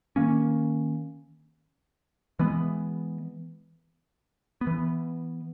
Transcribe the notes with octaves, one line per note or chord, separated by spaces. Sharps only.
D#3 A#3 C#4
E3 G#3 B3
B3
E3